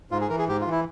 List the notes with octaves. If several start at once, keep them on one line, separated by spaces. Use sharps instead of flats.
G#2 F4
G#4
E3 A#4
G#4
G#2 G4
F4
E3
E4